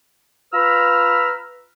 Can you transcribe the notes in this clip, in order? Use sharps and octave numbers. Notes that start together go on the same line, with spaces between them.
F4 B4 A#5 B5 E6 F6